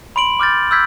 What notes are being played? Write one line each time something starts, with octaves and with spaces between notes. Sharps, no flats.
B5 C6 D7 F#7
D6 F6 G6 A6
E6 F6 G6 G#6 B6